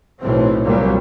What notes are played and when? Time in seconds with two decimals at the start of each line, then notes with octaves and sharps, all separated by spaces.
0.20 B1 A2 E3 C4
0.64 F1 C2 A#2 F#3 G3 A#3